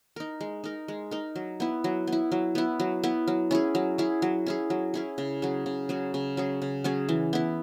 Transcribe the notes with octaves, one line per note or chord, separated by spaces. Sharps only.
D#4 A#4
G#3
D#4 A#4
G#3
D#4 A#4
F#3
B3 E4
F#3
B3
E4
F#3
B3 E4
F#3
B3 E4
F#3
C#4 E4 G#4
F#3
C#4 E4 G#4
F#3
C#4 E4 G#4
F#3
C#4 E4 G#4
C#3
F#3 C#4 G#4
C#3
F#3 C#4 G#4
C#3
F#3 C#4 G#4
C#3
F#3 C#4 G#4
E3
B3 E4